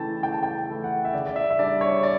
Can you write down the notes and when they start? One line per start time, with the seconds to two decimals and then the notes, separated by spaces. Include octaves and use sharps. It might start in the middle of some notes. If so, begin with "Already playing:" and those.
Already playing: C#3 E3 A3 E4 G5 A5
0.23 C#3 G5
0.33 A5
0.43 G5
0.69 E3 A3 E4
0.84 F#5
1.05 E5
1.13 C#3 D5
1.26 D5
1.36 E5
1.50 E5
1.59 G3 D4 D5
1.81 C#5
2.03 D5